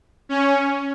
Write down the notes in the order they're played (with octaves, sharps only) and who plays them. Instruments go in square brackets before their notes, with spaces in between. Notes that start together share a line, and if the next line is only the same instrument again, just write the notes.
[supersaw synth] C#4